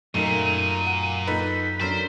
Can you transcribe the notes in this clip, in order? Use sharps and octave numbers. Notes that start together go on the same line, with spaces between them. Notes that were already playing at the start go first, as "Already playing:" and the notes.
F#2 A#2 A3 D#4 A#4 D#7
F#5
D#4 A4 B4 B6
F#3 D4 A4 A#4 C5